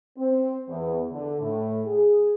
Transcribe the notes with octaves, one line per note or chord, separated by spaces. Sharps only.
C4
E2
D3
A2
G#4